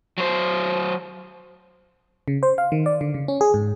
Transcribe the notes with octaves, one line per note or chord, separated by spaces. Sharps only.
F#3 C5
C#3
C5
F5
D#3
D5
D3
C#3
C#4
G#4
G#2